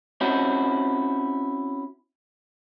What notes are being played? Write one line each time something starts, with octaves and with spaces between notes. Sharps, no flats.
C4 C#4 E4 F#4